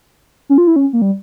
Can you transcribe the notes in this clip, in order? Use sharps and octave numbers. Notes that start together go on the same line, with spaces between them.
C#4
F4
E4
C#4
A#3
G3